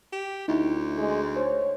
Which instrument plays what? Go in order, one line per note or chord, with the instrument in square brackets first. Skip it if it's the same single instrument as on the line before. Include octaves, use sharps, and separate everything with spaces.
[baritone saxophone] G4
[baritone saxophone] D2 [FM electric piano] D#4 E4
[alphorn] G#3
[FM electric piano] C5 [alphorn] C#5